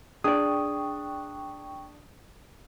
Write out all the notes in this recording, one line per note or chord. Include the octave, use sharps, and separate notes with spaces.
D4 G#4 D5 G5 C#6 D#6